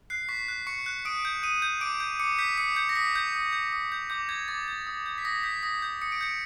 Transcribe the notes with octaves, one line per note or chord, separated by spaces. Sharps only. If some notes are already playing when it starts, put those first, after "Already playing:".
F#6 C7
C#6 B6
F#6
C#6 C#7
F#6
D#6 D7
G6
D#6 D#7
G6
D6 D7
G6
D6 C#7
G6 B6
D#6 C#7
G6 C#7
A#6
D#6 B6
G6
D#6
G6
D#6
G6
D6 G6
G6 G#6
D6 A6
G6
D#6
G6
B6
D#6 A#6
G6 B6
D#6 A#6
G6
D#6 C#7
D7
G6 C#7